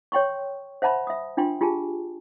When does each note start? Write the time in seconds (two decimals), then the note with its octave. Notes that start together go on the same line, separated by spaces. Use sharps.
0.12 C#5 G5 C6 C#6
0.82 C5 E5 F#5 A5 B5 C6
1.07 E5 D#6
1.37 D4 F4 G5 C6
1.61 F4 G4 G#4 G#5 A5